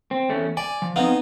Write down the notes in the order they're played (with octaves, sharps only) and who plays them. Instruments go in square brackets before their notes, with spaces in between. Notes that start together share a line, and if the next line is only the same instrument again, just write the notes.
[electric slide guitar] C4
E2 A3 C#4
[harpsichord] D5 [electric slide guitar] G#5
[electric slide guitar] F3
[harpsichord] B3 D#4 [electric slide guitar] C4 F5